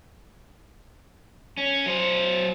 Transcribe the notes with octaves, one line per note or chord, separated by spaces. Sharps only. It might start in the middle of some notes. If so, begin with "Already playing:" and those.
C#4
F#3 C5